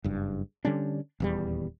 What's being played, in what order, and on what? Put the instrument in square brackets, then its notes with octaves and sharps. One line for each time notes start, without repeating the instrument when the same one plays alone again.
[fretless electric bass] F#1 G2
D3 G3 C#4 D4
D#1 E2 G3